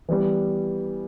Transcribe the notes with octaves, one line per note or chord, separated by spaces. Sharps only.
E3 G3 B3